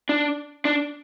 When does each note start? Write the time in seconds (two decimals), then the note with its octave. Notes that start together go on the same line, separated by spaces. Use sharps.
0.09 D4
0.65 D4